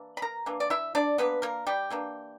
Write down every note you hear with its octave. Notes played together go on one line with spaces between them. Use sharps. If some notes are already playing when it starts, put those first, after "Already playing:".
Already playing: E3 A#3 D4
B5
A#4 A#5
E3 A#3 D4
D5
E4 E5
D4 D5
E3 A#3 B3 D4 B4
A#3 A#4
G3 G4
E3 A#3 D4